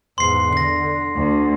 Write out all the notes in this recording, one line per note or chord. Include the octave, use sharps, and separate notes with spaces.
E2 G#2 C6 C7
D3 A#6 C7
D2